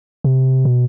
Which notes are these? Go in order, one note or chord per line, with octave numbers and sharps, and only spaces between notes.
C3
B2